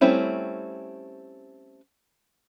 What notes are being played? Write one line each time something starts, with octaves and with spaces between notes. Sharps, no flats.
G3 A3 C4 C#4 E4